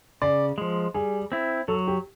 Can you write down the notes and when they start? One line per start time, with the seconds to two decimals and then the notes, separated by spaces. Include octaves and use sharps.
0.22 C#3 D5
0.58 F3 G#3
0.94 G3 G#4
1.32 C4 E4
1.68 F#3 A4
1.87 G4